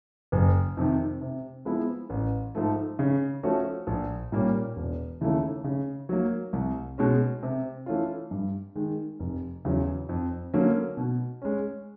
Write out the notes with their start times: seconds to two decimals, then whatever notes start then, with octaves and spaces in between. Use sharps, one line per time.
0.32 F#1
0.77 F2 C3 D#3
1.21 C3
1.65 F3 G#3 B3 E4
2.10 A1
2.55 G#2 F3 A3
2.99 C#3
3.43 F3 A3 C#4 F#4
3.87 A#1
4.32 A#2 G3 A#3 C#4
4.76 E1
5.21 D#2 C#3 E3 A3
5.64 C#3
6.09 F#3 A#3
6.53 C2
6.98 B2 G#3 C#4
7.43 C3
7.86 E3 A3 C#4 F4
8.31 G2
8.76 D#3 G#3
9.20 F1
9.65 E2 C#3 F#3
10.09 F2
10.54 D3 F#3 A#3 C#4
10.97 B2
11.42 G#3 C#4